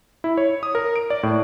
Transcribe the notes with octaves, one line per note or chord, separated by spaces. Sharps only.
E4
C#5
D#6
A#4
D7
D5
A2